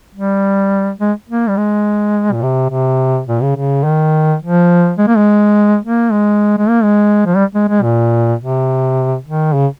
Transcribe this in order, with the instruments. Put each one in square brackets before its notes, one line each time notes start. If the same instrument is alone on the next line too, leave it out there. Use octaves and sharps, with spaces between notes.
[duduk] G3
G#3
A#3
G3
G#3
A#2
C3
C3
A#2
C#3
C#3
D#3
F3
G#3
A#3
G#3
A#3
G#3
G#3
A#3
G#3
F3
G3
G#3
G#3
A#2
C3
D#3
C#3